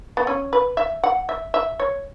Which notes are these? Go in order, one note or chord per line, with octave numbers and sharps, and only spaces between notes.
B3
C#4
B4
E5
F#5
E5
E5
C#5